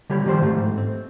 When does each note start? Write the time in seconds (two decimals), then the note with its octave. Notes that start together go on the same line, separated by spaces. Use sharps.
0.10 D3 G3 G4 C#5 B5
0.26 D#3 F3 G3 G4 C5
0.42 G#2 A3 C4
0.78 C4